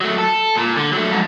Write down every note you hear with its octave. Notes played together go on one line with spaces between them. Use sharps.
F#3 A3
A4
A#2
D3
F#3 A3
F2 G#2